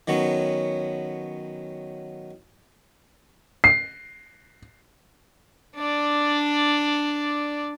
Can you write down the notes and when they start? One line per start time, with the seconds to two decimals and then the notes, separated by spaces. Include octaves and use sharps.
0.08 D#3 F#3 B3 C#4
3.64 C7
5.77 D4 D5